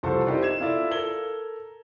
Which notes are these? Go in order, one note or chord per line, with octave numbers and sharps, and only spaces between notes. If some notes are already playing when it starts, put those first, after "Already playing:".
C2 F3 A4 C5 A5 C#6
D#4 E4 G4 A#4 C5 D5
G#6 E7
E4 F4 A4 D5 E5
A4 A#4 G#6 G7